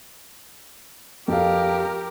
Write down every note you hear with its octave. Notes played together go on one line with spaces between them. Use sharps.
F2 G4 A4 A#4 F5